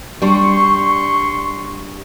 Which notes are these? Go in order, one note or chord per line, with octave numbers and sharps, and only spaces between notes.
G3 D4 C6 C#6